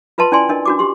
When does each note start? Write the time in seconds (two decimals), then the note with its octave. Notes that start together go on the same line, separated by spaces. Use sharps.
0.18 F4 B4 D#5 A5 C6
0.32 C#4 E4 D5 G5 G#5 C6
0.49 D4 A#4 D#5
0.66 D4 F#4 D6
0.79 G4 C6